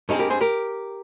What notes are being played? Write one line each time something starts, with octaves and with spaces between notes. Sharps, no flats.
G2 F3 G#3 C4 D#4
G4 A#4
G#4 C5
G4 A#4